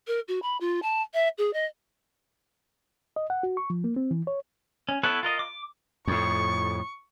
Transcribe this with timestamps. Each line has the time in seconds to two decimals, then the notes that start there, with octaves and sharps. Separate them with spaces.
0.07 A#4
0.28 F#4
0.42 B5
0.61 F4
0.82 A5
1.14 E5
1.38 G#4
1.53 D#5
3.16 D#5
3.30 F#5
3.43 F#4
3.57 C#6
3.70 F3
3.84 A#3
3.96 C4
4.11 E3
4.27 C#5
4.89 C#4
5.03 B3 E4 A4 B4 C#5
5.23 F4 A#4 D#5
5.39 D6
6.07 F2 A2 C#6